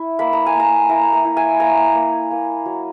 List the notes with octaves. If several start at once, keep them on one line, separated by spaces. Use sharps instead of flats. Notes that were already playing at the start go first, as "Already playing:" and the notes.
Already playing: E4
A#3 B5
A#5
G#5
A#3 A#5
E4 A#5
A#5
E4
G#5
A#3 A#5
A#3
A#3
F#3